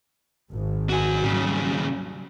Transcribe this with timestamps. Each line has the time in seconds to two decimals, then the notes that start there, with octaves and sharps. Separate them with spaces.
0.49 G#1 G#2
0.89 F#4 G#5
1.24 D#2 C#3 F#3 G3